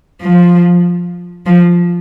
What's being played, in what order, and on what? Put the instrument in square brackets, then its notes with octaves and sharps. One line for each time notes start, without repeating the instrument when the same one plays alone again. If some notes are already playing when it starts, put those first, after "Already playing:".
[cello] F3
F3